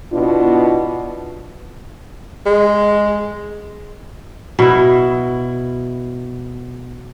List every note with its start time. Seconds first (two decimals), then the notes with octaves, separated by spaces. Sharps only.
0.13 B2 B3 D4 E4 F4 B4
2.46 G#3
4.59 B2 E4